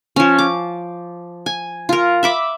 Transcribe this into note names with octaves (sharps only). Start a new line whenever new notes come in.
F3 C#4
D6
G#5
F4 A#4
E5 B5 D6